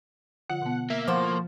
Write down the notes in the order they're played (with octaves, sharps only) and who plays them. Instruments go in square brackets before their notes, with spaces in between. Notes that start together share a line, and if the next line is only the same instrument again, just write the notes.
[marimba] D3 F3 F4 [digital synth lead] F#5
[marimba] B2 B3
[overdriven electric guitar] A#3 [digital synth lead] E5
[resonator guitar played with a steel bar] A2 C5 [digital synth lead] F3 [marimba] F5 F#5 D6